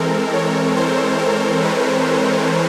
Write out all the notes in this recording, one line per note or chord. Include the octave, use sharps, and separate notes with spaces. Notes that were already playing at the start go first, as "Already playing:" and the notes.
Already playing: E3 G#3 C4 A4 A#4
C#5
C5
A#4
B4